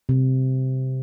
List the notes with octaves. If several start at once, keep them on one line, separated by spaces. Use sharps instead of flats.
C3